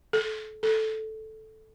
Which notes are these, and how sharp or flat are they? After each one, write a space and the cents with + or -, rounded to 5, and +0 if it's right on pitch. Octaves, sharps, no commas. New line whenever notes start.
A4 -30
A4 -5